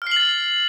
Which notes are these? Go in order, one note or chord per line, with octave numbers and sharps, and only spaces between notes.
F6 A6 C7 F#7